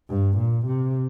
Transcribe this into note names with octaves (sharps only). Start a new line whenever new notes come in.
G2
A#2
C3